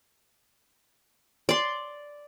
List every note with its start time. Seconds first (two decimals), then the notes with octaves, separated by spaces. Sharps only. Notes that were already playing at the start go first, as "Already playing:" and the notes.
1.49 D5 C6